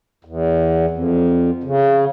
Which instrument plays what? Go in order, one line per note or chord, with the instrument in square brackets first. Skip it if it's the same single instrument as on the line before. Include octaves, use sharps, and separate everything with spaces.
[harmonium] E2
F2
C#3